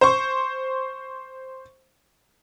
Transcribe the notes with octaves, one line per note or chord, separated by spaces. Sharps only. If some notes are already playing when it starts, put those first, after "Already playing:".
C5 C#6